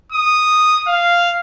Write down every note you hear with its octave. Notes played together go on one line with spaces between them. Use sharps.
D#6
F5